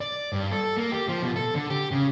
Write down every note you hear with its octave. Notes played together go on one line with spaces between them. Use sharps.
D5
G2
A4
A#3
G4
F3
B2
A4
D3
G4
C#3